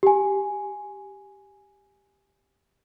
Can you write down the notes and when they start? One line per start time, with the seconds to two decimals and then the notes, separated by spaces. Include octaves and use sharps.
0.03 G4 G#5